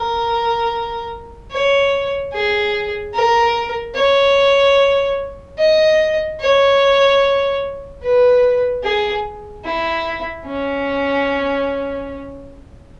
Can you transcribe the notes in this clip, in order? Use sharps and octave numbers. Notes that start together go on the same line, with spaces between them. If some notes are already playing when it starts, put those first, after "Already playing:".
Already playing: A#4
C#5
G#4
A#4
C#5
D#5
C#5
B4
G#4
E4
C#4